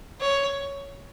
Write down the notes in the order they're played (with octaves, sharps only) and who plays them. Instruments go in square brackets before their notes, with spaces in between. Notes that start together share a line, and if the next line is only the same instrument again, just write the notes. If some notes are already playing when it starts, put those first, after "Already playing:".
[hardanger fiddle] C#5